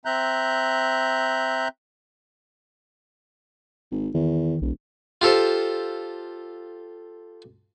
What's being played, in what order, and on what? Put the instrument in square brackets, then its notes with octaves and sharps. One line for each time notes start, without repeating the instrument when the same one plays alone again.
[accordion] C4 E5 A#5 F#6 G6
[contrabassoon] G#1
[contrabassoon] E2 [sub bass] D#3
[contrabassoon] E1 [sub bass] B1
[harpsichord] F4 G4 A4 C5